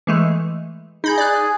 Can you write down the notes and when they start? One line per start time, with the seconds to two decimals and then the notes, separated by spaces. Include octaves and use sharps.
0.07 E3 G#3 A3
1.04 D#4 G#4 B5 G6
1.18 D5 F#6